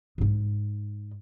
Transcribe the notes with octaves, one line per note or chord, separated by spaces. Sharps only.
G#2 D#4